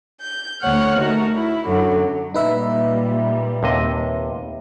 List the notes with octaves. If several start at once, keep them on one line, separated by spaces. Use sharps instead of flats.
G6
D2 C#5 F#5 F6
A3 D#4 F#4 A#4
E4
F#2 D3 F#3
A#2 G3 D#4 B4 E5
D#2 C3 D#5